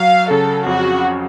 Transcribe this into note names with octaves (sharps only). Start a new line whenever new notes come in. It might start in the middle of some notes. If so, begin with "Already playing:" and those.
Already playing: F#3 F5
C#3 A4
F2 F#4